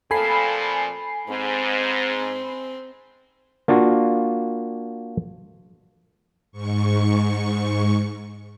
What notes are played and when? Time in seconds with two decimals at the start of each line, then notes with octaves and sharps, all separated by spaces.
0.11 A#2 F3 C4 A4 G#5 B5 C7
1.28 G#2 C4
3.68 A#3 D4 F4 F#4
6.52 G#2 C#6